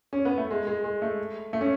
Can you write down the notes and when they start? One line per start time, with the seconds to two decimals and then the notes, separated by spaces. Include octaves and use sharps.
0.13 C#4
0.25 B3
0.38 A3
0.51 G#3
0.67 G#3
0.84 G#3
1.02 A3
1.53 A3
1.61 C#4